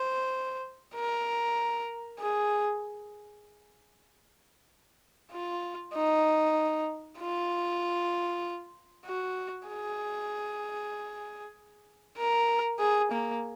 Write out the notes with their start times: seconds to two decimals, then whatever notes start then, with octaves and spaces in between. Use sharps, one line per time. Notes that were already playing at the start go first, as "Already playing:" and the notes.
Already playing: C5
0.95 A#4
2.20 G#4
5.32 F4
5.94 D#4
7.19 F4
9.06 F#4
9.68 G#4
12.17 A#4
12.79 G#4
13.12 A#3